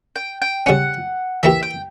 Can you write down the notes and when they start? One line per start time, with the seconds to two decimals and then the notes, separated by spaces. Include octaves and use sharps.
0.16 G5
0.42 G5
0.66 C#3 G3 C#4 F#5
1.43 E3 A#3 E4 G4 E5
1.63 G5